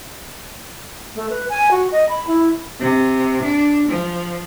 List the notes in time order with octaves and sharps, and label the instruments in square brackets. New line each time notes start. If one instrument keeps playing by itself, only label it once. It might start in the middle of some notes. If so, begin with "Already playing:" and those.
[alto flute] A3
B4
G#5
F#4
D#5
B5
E4
[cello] C3
D4
F3